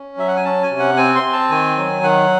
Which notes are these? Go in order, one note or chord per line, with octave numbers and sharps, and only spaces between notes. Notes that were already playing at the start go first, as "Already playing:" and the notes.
Already playing: C#4
F#3 E5
F#5
G#5
C#4 A5
G#5
C3
F#5
C4 G#5
C6
C4
A5
D#3 G#5
F#3
D#3 F#5